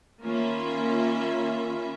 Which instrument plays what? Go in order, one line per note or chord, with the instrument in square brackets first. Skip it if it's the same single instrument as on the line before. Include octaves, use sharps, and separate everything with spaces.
[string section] D#3 A#3 C#4 F4 E5 B5